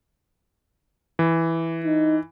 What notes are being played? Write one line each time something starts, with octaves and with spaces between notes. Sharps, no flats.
E3
D#4